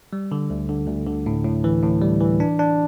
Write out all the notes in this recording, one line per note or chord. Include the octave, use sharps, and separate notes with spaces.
G3
D3
D2
D3
D2
D3
A2
A2
E3
A2
G3
E3
D4
D4